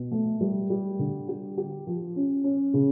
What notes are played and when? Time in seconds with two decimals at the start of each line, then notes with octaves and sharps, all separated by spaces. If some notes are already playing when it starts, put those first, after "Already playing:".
Already playing: B2
0.12 A3
0.41 G3
0.70 G3
0.99 D3
1.28 G4
1.57 G4
1.87 F3
2.16 C#4
2.44 C#4
2.74 C#3